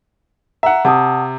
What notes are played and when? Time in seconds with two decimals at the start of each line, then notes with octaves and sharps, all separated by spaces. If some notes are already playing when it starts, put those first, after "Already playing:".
0.63 E5 F#5 A#5
0.85 C3 F#5 A5 D#6